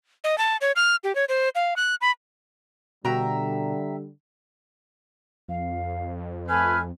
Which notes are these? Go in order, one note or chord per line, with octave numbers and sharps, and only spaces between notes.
D#5
A5
C#5
F6
G4
C#5
C5
F5
F#6
B5
B2 D3 G3 F#4 E5 G5 A#5
F2 F5
A3 B4 G#5 F6